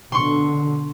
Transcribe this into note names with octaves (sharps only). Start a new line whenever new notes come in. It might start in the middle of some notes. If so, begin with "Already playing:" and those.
B2 D3 C6 C#6